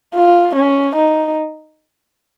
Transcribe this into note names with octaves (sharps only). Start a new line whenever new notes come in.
F4
C#4
D#4